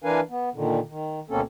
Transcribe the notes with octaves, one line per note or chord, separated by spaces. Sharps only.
E3 D4 A#4 B4 F5 G#5
B3
A#2 D3 D#3
D#3
D2 B2 A#3 C4 C#4 A4